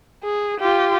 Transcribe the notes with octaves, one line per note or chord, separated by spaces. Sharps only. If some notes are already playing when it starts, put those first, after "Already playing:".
G#4
F4 G4